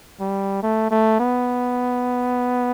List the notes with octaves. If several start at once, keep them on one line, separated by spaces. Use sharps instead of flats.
G3
A3
A3
B3